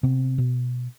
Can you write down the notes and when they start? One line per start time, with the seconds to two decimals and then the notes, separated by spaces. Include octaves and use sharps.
0.03 C3 B3 C4
0.38 B2